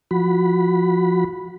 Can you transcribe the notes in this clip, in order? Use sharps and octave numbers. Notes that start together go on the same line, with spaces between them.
F3 F#4 B5